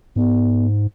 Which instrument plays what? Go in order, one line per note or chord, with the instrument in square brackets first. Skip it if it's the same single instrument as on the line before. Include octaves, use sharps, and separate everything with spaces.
[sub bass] G#2 [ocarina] B3